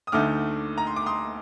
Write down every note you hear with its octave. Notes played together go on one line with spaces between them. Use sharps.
D#6
D2 D3 A3 D#4 D6 F6
A#5
C6
D6
C6 D#6